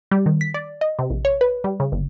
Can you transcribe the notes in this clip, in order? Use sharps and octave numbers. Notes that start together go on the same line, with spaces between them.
G3
D#3
B6
D5
D#5
C3
A#1
C#5
B4
G3
C#3
G1